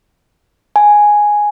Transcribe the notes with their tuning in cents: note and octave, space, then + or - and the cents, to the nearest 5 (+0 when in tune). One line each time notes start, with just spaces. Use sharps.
G#5 +0